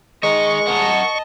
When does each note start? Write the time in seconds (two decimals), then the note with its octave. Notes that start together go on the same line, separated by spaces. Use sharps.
0.23 G#3 A#4 D#5 C#6
0.67 A#4 D#5 F#5 A5